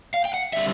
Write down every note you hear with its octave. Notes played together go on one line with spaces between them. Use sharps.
F5
G5
F#5
D3 G3 C4 E5